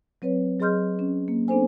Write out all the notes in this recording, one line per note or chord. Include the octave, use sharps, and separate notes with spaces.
F#3 C4 B4 C#5
F#3 G#4 D#5 C6 F6 G6
C#4
A#3
B3 C4 D4 A4 C5 G#5